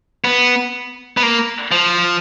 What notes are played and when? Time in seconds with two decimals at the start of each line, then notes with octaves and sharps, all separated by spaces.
0.24 B3
1.17 B3
1.23 A#3
1.72 F3